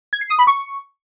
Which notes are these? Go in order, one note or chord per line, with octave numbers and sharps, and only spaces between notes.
G#6
C7
D#6
B5
C#6